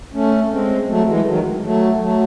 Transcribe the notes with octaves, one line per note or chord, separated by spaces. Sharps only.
A3 C#4
G#3 C4
F#3 A3
E3 G#3
D#3 F#3
F#3 A3
F#3 A3